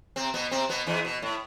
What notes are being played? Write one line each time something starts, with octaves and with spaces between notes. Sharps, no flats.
C3 C4
B2 B3
C3 C4
B2 B3
E2 E3
B2
A2